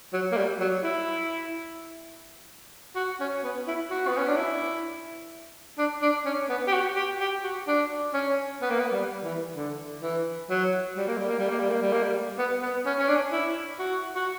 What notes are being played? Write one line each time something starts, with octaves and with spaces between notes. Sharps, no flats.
F#3
A#3
G3
F#3
E4
F#4
C#4
B3
E4
F#4
B3
C#4
D4
E4
D4
D4
C#4
B3
G4
F#4
G4
G4
F#4
D4
C#4
B3
A#3
B3
G3
E3
D3
E3
F#3
G3
A#3
G3
A#3
G3
A#3
G3
A#3
G3
A#3
G3
B3
B3
C#4
C#4
D4
E4
F#4
F#4